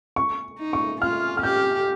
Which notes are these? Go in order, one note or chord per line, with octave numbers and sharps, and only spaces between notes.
C#6
D#4
C#6
F4 F6
F6
G4 G6